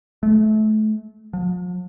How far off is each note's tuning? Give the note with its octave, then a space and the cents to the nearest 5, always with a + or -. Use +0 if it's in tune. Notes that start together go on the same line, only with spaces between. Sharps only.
A3 -30
F3 +45